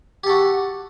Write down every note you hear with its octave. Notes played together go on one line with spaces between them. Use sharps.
F#4 G4 A4